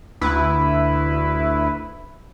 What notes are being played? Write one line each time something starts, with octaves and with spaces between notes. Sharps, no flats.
D2 E4 B4